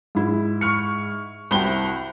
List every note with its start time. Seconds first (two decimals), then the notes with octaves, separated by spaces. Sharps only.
0.15 G#2 E4
0.61 C#6 F6 C#7
1.51 C2 F#4 C5 G5 B5 G7